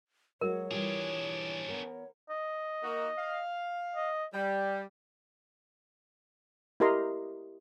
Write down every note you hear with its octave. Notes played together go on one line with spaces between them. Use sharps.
F#3 G#3 F#4 A#4 C#5
E3 G3 D4 F4 G#4
B3 A#4
D#5
A#3 D#4 F#4
F5
D#5
G3 G5
E4 G4 A#4 D#5 A#5 C6